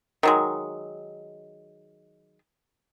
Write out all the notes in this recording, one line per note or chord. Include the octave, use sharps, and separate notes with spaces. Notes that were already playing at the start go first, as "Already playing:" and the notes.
D#3 F#3 G#3